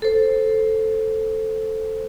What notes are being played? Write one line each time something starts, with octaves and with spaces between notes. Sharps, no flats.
A4 C5